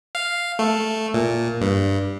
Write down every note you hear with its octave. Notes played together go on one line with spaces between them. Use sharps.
F5
A3
A#2
G2